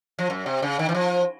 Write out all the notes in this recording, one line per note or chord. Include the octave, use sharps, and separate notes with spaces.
F3
F#2
C3
C#3
D#3
E3
F3